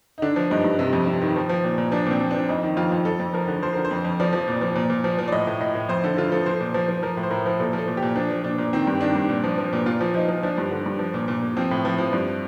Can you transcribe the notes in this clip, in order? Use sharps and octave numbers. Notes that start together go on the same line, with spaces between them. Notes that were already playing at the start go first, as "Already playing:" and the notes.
D#4
D3 D4
F3
G2 D#4
G2
C3
F2
C3
D#3
F3
F3
A#2
A#2
F3 D4
A#2 C4
F3
F3 D4
F2 D#4
D#3
F2 F4
F2
F2 A4
F2
F3 A#4
D3
F3 C5
D3 A#4
C5
F2
F2
F3 D5
F3
A#2
F3
A#2
A#2
F3
F3
D5
A2 D#5
A2
A2 D#5
A2
F2 C5
D3 A4
D3 F4
F3 A4
F3 C5
A#2
F3
F3
F3 A#4
A2
C5
A2 A#4
F3
A#2 A4
F3
A4
A#2
G4
A#2
F3 D4
F3
A#2 D4
A#2
D#3 C4
G2
D#3 D4
G2
A#2
F3
F3
A#2
A#2 F4
F3
F3 D#4
F3
F3 D4
G2
D3
G2
F3
A#2
A#2
A#2
F3 C4
A2
F3
F3
G2